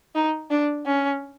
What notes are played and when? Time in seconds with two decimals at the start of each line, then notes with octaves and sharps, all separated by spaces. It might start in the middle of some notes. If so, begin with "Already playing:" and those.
0.15 D#4
0.50 D4
0.86 C#4